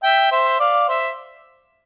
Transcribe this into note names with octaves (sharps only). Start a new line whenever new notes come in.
E5 G5
C5 E5
D5 F5
C5 E5